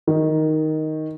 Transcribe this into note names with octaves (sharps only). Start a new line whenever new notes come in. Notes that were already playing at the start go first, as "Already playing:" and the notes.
D#3